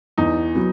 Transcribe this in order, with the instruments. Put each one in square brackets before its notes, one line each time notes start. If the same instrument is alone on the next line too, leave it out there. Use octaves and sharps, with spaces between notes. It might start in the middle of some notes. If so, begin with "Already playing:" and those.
[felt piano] E2 [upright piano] D#4
[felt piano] F#3 B3